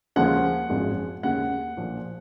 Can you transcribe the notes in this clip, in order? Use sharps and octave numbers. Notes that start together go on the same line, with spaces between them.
D#2 C#3 F3 G#3 F#5
G#1 F#2 F3 G#3
D#2 C#3 G#3 F#5
A#1 A#2 F3